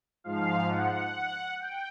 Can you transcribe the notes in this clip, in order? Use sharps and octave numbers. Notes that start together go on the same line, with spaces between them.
G#2 F3 F5
F#5
G5